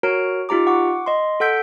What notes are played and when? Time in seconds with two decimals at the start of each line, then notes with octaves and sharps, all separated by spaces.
0.03 F#4 A#4 C#5 A#5 D7
0.49 D#4 F4 G4 A#5 D6
0.67 F#5 C#6 D6
1.06 D#5 C6
1.40 A4 F#5 E6 G6 B6 D7